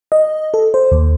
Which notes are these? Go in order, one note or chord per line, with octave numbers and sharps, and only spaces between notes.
D#5
A4
C5
D#2